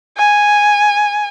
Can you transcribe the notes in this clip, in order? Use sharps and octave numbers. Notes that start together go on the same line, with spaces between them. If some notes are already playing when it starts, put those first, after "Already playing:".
G#5